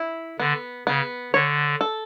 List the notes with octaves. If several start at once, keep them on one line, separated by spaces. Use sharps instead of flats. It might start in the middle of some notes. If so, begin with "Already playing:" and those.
Already playing: E4
D3 B3
C#3 B3
D3 C#5
A4